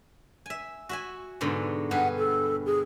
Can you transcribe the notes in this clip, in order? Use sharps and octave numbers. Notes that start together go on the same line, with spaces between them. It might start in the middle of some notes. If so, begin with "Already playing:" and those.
E5 G#5
F#4 E5 G#5
G#2 B2 D3
G2 G#4 B4 F#5
A4
G#4